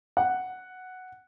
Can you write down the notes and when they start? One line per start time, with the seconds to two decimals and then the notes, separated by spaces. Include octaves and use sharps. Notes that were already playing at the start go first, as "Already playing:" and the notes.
0.17 F#5